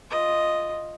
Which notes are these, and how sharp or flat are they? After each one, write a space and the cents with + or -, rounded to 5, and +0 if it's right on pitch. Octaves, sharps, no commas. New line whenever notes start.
F4 +0 D#5 +0